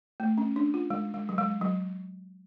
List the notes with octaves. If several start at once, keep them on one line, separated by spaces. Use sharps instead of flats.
A3
C#4
D4
F4
G#3
G#3
F#3
G#3
F#3